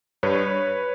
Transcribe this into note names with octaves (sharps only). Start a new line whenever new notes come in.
G2 B4 C#5